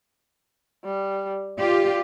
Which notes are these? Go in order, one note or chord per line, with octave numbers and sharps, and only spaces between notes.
G3
F4 G4 D5